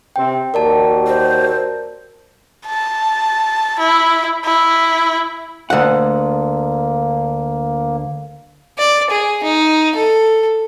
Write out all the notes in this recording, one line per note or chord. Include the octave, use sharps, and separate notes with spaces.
C3 C4 G5
D#2 F#4 G4 A#4 D5 A5
C5
A5
E4
E4
D2 A#3 F#5
D5
G#4
D#4
A4